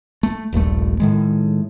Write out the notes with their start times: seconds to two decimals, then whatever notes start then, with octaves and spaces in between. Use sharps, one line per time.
0.23 A3
0.53 D#1 A#1 G2 A3
1.00 A2 D#3 G#3